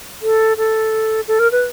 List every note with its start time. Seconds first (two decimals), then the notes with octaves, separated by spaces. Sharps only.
0.22 A4
0.57 A4
1.28 A4
1.39 A#4
1.52 B4